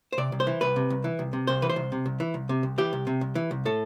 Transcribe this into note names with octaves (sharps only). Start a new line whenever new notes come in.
C5
C3 D5
C2
C5
E3
C2 B4
C3
C2
E3
C2
C3
C2 C5
E3 B4
C5
C2
C3
C2
E3
C2
C3
C2
E3 G4
C2
C3
C2
E3
C2
A2 A4